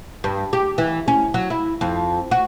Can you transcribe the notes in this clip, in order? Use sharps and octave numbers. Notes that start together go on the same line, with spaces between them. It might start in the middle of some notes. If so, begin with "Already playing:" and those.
G2
G4
E3
C#4
F#3
E4
F2
F#4